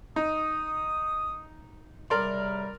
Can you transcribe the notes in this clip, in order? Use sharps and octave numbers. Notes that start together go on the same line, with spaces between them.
D#4 D#6
C#2 C3 G3 A#4 D5 C6